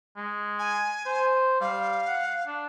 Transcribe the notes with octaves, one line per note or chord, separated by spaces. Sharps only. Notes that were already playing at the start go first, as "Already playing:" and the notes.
G#3
G#5
C5
G3 F5
F#5
D4